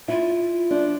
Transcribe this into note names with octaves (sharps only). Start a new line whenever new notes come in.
E4 F4
F3 D4